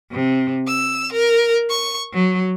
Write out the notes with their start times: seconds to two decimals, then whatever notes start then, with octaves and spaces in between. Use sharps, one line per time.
0.11 C3
0.67 E6
1.13 A#4
1.70 C#6
2.13 F#3